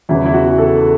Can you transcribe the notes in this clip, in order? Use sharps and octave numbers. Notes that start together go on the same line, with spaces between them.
E2 C#3 E3 E4
E4
F#4
A4